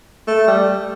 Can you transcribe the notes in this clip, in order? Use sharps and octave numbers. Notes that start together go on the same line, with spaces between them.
A3
G3